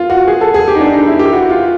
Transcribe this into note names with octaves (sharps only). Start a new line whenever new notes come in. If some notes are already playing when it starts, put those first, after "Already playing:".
Already playing: F4
F#4
G#4
A4
G#4
G4
D#4
D4
D#4
E4
G4
F#4
F4